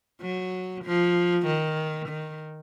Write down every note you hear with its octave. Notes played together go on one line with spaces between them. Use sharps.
F#3
F3
D#3
D#3